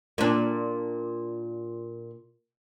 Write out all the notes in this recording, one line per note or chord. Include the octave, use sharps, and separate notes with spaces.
A#2 D4